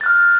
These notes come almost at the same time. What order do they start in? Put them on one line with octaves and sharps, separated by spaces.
A6 F#6 F6